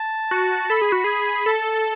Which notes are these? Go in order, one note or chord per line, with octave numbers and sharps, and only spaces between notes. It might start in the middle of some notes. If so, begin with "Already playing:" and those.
Already playing: A5
F#4
A4 B5
G#4
F#4
G#4
A4 A5